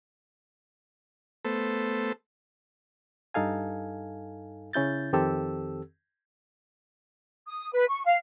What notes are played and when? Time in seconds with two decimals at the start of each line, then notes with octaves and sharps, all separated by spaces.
1.45 A3 B3 A4 C5
3.34 G2 D#4 A4 F5 G#5
4.73 C#3 C#4 E4 G6 A6
5.13 F2 D#3 C4 G4 A4 E6
7.47 D#6
7.73 B4
7.88 C#6
8.05 F5